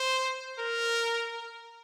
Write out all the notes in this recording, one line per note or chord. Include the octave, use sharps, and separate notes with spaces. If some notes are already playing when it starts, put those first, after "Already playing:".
Already playing: C5
A#4